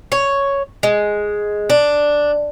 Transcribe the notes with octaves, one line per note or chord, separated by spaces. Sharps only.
C#5
G#3
D4